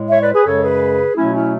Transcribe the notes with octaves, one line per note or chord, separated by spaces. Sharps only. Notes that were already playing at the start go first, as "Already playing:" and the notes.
Already playing: A2 G#3
C#5 E5
B4 D5
G#4 B4
F#2 C#3 G#3 A4 C#5
G#4 B4
B2 F#3 A3 C#4 E4
C#4 E4